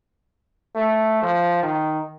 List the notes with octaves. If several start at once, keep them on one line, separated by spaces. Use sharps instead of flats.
A3
F3
D#3